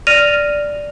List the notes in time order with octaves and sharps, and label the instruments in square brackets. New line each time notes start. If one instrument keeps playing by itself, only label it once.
[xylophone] D5 F6 A#6 D#7 F7